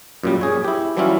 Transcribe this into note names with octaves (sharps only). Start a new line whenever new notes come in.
F#2 A#2 G3
G#4 C#5
E4 G4
E3 F#3 G3 C#4 E4 F4